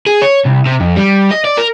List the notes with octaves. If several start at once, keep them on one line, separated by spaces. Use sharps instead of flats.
G#4
C#5
C2
C3
F2
G3
D#5
D5
A#4